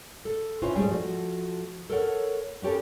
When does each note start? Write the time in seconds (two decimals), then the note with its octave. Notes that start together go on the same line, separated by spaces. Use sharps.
0.25 A4
0.62 C4 C#4 E4 F4 B4 C5
0.76 G#2 G3 A3 G#4
0.88 F3 A3 F#4
1.90 A4 A#4 C#5 F#5
2.62 B3 C#4 G4 A4 A#4